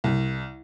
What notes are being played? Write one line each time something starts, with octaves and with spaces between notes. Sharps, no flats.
C2